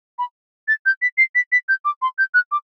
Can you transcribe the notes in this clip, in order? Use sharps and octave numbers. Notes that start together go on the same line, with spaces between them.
B5
A6
G6
B6
C7
B6
B6
G6
D6
C6
G6
F#6
D6